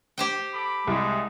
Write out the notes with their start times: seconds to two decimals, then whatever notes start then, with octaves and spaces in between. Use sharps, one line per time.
0.18 G4 C5 G5
0.54 A4 B5 D6
0.87 C2 G#3